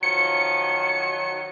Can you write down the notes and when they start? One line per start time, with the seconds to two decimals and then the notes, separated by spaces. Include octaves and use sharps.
0.03 D#3 F3 F#3 C#7